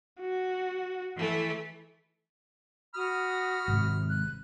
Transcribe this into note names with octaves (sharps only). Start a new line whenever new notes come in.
F#4
E3 A3
F#4 B5 D#6 F6
G#1 G#2 C3
F#6